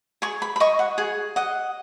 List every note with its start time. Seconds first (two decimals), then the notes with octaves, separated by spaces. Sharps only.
0.22 G#4 C#6
0.42 B5
0.56 B5
0.60 D#5 C#6
0.79 F#5
0.98 G#4 F#5
1.36 D#5 F#5